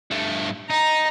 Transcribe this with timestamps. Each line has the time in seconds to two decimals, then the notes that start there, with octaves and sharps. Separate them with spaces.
0.11 G2 A3
0.70 D#4 A#5